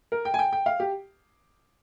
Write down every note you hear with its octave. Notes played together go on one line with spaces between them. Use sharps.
A#4
G5
G#5
G5
G5
F5
G4